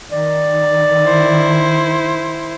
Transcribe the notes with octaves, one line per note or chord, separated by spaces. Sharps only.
D#3 D5
E4 C5